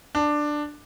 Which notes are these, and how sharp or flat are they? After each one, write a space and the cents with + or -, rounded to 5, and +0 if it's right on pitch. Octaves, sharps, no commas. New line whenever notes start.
D4 +10